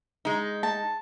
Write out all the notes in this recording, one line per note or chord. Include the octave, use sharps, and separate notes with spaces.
G#3 D#4
A5